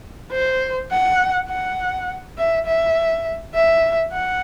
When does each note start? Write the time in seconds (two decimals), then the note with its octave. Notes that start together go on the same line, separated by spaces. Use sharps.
0.32 C5
0.91 F#5
1.49 F#5
2.38 E5
2.66 E5
3.55 E5
4.12 F#5